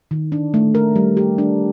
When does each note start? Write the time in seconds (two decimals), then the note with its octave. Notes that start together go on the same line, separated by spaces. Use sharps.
0.11 D#3
0.32 D4
0.54 A3
0.75 A#4
0.96 G3
1.17 G4
1.38 D4